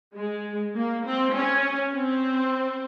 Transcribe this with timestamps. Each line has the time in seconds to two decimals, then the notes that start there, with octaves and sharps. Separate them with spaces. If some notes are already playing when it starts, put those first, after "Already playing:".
0.16 G#3
0.75 A#3
1.05 C4
1.35 C#4
1.94 C4